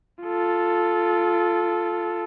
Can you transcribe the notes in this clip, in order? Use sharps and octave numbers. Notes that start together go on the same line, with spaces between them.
F4 A4